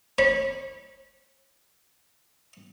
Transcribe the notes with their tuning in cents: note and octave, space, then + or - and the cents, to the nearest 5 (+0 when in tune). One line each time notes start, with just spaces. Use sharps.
C#5 -30 B5 -30